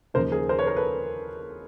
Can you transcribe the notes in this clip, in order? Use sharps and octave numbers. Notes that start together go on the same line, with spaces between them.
D#2 C#3 F3 A#4 C5
G#4 A#4
A#4 C5
B4 C#5
A#4 C5
A4 B4